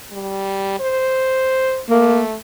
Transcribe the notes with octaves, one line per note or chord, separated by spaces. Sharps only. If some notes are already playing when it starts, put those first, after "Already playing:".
G3
C5
A3 A#3